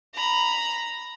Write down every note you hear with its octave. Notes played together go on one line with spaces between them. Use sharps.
A#5 B5